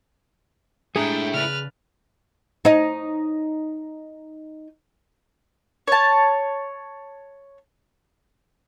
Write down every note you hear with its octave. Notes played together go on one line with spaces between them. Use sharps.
G#3 A3 D4 E4 G4 G#4 G5 A#5
C#3 B4 D5 F6
D#4 C#5 D#5
C#5 A5